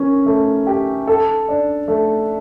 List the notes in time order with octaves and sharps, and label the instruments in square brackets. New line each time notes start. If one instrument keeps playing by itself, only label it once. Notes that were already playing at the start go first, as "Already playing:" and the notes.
Already playing: [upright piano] C#4 A#4
A3
G4
A4
D4
A3